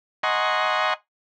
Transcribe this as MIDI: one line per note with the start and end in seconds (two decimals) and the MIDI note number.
0.23 0.94 75
0.23 0.94 78
0.23 0.94 80
0.23 0.94 82
0.23 0.94 84
0.23 0.94 85